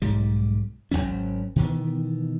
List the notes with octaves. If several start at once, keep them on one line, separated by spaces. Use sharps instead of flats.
B1 G#2 G3
G#1 G2 F#3 C#4
B2 D#3 E3 B3